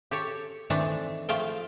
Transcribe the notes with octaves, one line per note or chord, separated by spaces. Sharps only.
G4 A4 C#5
D#3 E3 A3 C4 D4 A4
F3 A3 F4 F5 G5